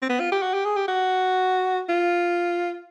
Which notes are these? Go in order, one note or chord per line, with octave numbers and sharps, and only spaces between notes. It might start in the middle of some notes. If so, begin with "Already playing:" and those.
C4
B3
F4
G4
F#4
G4
G#4
G4
F#4
F4